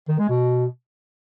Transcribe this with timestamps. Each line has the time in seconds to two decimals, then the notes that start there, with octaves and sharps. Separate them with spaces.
0.09 D#3
0.19 G#3
0.29 B2